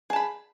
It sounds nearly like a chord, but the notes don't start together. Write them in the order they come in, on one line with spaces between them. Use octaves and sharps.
G#4 A5 B5